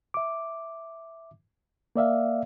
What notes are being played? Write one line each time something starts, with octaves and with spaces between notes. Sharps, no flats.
E5 D6
A#3 D5 E5 F5